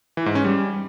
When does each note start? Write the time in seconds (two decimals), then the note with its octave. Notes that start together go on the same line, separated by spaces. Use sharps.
0.17 E3
0.26 G#2
0.35 C#4
0.44 G3